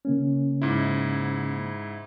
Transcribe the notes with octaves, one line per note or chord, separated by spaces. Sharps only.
C#3 A#3 C#4
G#2 E4